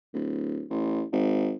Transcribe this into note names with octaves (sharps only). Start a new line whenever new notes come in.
D1
A1
G#1